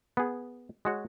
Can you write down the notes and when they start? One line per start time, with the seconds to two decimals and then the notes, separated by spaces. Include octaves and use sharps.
0.17 B3 G#4
0.85 G#3 F#4 C#5